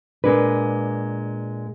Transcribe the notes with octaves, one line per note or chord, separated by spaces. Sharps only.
A#2 G#3 D4 B4